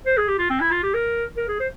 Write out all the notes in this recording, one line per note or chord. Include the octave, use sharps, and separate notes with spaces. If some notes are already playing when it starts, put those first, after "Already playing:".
C5
G#4
G4
F4
C4
E4
F4
G4
A#4
A#4
G#4
C5